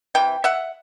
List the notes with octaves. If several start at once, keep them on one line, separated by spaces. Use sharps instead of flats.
C3 E3 G5
E5 F#5